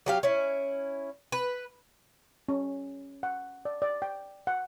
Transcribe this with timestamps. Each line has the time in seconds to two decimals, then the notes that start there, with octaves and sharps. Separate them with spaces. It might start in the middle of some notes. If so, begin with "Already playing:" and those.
0.06 F#3 G4 F5
0.23 C#4 E4
1.32 B4
2.48 C#4
3.23 F#5
3.65 D5
3.82 D5
4.02 G5
4.47 F#5